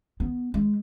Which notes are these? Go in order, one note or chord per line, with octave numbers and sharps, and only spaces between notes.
B3
G#3